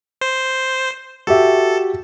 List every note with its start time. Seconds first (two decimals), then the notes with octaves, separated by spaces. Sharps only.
0.21 C5
1.27 F#4 G4 A4 E5